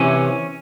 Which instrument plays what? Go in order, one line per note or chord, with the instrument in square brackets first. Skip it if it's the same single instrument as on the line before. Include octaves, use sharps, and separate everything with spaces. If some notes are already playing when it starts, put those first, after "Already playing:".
Already playing: [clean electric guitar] C3 E3 C#4